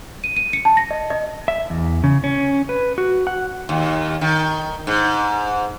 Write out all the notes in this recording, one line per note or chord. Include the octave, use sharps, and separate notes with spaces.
D#7
D#7
C#7
A5
A#6
D#5
D#5
E5
E2
C#3
C#4
B4
F#4
F#5
D#2
D#3
G#2